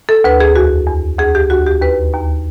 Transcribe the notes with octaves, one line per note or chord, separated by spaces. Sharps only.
A4
D2 B4
G#4
E2 F#4
E2
D2 G#4
G4
D2 F#4
G4
D#2 B4
D#2